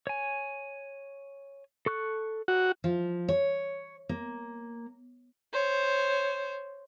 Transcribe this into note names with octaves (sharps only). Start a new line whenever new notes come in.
C#5 G#5
A4 C#6 F#6
F#4
F3
C#5
A#3
C5 C#5